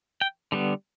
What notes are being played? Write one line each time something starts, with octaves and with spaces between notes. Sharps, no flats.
G5
D3 G3 B3